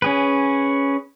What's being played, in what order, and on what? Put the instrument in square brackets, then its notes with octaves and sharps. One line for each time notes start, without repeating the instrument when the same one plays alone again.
[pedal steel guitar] C#4 G#4 B4